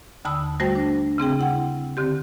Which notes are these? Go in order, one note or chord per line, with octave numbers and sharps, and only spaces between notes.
D#2 D3 A5 B5 D#6 E6
G3 A3 F#4 C5 G5 A5
D4
C#3 C4 G#4 G5
E4 F#5 G5
D3 C4 G4